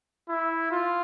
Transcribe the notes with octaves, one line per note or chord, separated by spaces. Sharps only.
E4
F4